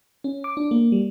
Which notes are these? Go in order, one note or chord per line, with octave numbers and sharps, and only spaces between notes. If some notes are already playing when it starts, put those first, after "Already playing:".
C#4
D6
D4
A#3
G3